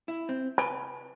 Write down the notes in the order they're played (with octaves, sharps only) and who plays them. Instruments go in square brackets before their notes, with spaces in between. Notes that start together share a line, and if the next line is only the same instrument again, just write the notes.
[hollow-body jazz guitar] E4
C4
[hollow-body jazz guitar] B4 [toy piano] G#5